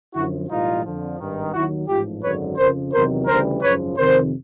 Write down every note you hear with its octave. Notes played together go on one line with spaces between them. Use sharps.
F#2 D3 F3 E4 F#4
B1 A2 E3 G3 D#4 F4
F2 D3 F3
G#1 G2 D#3
D#2 D#3 F#3 E4 F#4
A1 G#2 F3 F4 G4
G#1 F#2 D3 F#3 B4 C#5
F2 C#3 F3 A#4 C5
E2 C3 D#3 F#3 A#4 C5
D2 C#3 E3 G3 A#4 C5
G#1 F#2 C#3 F3 B4 C#5
F2 C3 D#3 A#4 C5